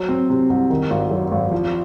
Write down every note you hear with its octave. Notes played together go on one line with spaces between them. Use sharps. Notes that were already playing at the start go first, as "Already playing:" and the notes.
Already playing: F#3
C4
C3
C2
D#3
G#1
F#2
G#1
F3